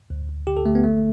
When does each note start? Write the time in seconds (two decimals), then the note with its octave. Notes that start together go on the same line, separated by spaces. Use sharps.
0.10 D2
0.29 D2
0.47 D3 G4
0.57 A4
0.66 D3 A3
0.75 B3
0.84 A1 A3